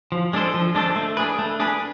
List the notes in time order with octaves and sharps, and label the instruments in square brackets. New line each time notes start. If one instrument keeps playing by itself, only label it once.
[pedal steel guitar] F3
G#3 D4 A4 C5
F3
G#3 D4 A4 C5
A3
D4 G#4 B4
A3
D4 G#4 B4